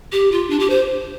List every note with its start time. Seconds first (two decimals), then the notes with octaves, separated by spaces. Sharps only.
0.12 G4
0.32 F4
0.50 D4
0.60 G4
0.70 C5